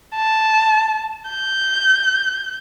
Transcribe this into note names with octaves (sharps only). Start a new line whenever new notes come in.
A5
G6